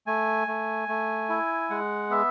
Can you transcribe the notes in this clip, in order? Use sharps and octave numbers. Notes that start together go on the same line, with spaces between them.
A3 G#5
A3
A3
E4
G#3 F#5
B3 E5